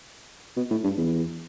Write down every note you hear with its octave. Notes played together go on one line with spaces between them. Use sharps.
B2
A2
G2
E2